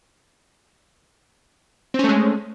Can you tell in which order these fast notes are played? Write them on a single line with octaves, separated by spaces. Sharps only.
C4 C#4 A3 G#3